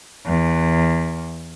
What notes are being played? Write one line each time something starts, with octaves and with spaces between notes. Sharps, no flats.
E2